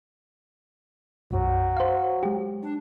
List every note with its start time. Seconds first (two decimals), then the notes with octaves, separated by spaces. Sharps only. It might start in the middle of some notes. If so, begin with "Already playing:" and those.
1.31 B1 F#2 F#3
1.77 C5 F5
2.23 G#3 G4
2.63 D4